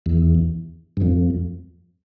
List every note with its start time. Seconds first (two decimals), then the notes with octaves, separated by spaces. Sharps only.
0.06 E2
0.97 G2
1.02 F2